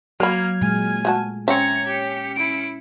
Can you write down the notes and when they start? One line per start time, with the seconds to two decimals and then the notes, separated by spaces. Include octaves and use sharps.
0.20 F#3 A#3 A#4 B5 F6 G#6
0.61 A#2 G#3 G#5
1.05 A3 F#4 A5
1.48 C4 C#4 C#5 E5 A#5 G#6 C#7
1.87 G4
2.36 E4 D7